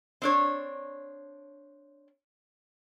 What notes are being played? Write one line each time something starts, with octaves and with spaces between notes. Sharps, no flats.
C4 D4 C#5